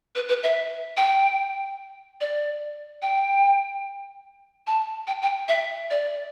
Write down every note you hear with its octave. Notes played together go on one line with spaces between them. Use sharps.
B4
B4
E5
G5
D5
G5
A5
G5
G5
E5
D5